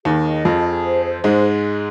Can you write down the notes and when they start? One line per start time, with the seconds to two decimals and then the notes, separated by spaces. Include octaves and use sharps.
0.05 D#2 D#3 G#4
0.26 D#5
0.45 F2 F3 G#4
0.65 G#4
0.84 C5
1.05 C5
1.24 G#2 G#3 G#4